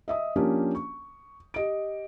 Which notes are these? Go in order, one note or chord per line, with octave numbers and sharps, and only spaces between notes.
D#5 E5 D#6
F3 A#3 C#4 D4 G4
C#6
G4 D#5 D7